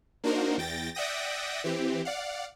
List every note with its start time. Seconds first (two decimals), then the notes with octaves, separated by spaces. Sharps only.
0.24 A#3 D4 D#4 F#4 A#4 C5
0.58 E2 G5 A6 A#6
0.95 D5 E5 F#5 G5 D#6 A#6
1.64 E3 C4 G4
2.05 D5 F5 F#5